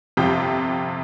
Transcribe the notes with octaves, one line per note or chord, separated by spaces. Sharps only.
G1 F2 C3 G5